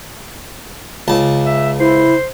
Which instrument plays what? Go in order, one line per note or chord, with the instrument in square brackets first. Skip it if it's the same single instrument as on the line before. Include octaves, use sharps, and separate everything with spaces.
[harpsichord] C#2 A5
[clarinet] E5
[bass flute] E4 [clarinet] C5